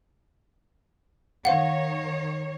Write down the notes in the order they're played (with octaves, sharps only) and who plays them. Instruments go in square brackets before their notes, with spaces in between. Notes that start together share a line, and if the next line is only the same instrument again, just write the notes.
[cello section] D#3 C#5 [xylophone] F5 F#5